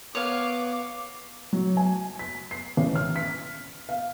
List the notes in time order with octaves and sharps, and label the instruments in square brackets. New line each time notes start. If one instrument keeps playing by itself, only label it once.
[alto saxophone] B3 [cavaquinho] C#5 F5 [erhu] D6
[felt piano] F#3
G#5
B6
C7
A1
F6
B6
F5